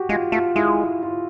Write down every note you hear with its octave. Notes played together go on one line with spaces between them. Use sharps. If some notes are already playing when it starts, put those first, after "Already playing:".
Already playing: F#4 G4
G#3 F4
A3 F4
G#3 E4
F4